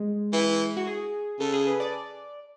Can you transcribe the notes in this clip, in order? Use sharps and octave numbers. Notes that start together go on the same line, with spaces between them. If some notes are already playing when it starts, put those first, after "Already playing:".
Already playing: G#3
E3 E4
F#4
G#4
C#3 A4
G#4
B4
D5